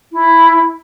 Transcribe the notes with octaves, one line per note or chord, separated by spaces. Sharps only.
E4